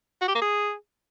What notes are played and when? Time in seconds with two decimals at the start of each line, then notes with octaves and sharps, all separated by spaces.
0.21 F#4
0.28 G4
0.35 A#3
0.42 G#4